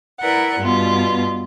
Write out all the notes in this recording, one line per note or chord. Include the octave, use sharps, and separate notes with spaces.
E4 A#4 B4 D5 F#5
G2 B2 B3 F4